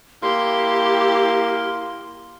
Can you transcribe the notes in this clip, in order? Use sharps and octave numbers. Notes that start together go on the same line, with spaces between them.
A#3 E4 G4 C6